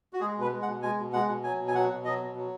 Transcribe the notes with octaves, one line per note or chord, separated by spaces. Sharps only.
F#4
G#3 G#4
B2 B4
G#3
F#5
B2
G#3 G#5
B2
G#3 F#5
B2
F#3 G#5
B2
G#5
F#3 F#5
B2
F#3 D#5
B2
F#3